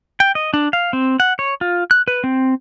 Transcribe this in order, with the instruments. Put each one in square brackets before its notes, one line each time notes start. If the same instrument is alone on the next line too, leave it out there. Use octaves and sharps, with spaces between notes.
[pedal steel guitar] G5
D#5
D4
F5
C4
F#5
C#5
F4
F#6
B4
C4